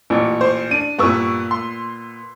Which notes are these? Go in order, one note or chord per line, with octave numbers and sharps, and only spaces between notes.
A1 A#2
C5
D4 D#7
G2 A#2 B3 C#6 E6
C6